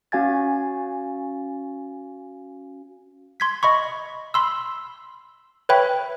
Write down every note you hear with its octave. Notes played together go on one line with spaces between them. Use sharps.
C#4 F#4 F5 G#5 G#6 A6
C6 G#6 B6
D#5 B5 C#6
B5 C6 E6
B4 C#5 E5 G5 B5